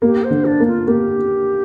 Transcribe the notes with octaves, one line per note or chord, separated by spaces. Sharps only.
A#3 G4
C5
D3
D4
A#3
F4
A#3 G4